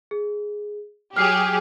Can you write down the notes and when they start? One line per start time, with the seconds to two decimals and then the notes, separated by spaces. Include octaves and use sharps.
0.11 G#4
1.16 F#3 G4 G#4 F6 C7